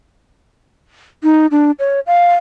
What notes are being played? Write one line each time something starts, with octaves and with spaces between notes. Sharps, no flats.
D#4
D4
C#5
F5